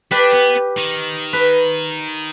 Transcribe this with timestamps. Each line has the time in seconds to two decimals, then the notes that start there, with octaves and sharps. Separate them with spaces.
0.11 D4 G4 B4
0.33 B3
0.77 D#3
1.33 B4